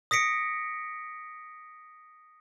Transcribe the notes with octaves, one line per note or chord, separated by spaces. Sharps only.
D#6 A#6 B6 C#7 D7